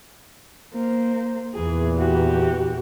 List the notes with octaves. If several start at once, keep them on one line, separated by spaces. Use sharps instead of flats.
A#3 C5
E2 A#2 E3 G#4
F#4 G4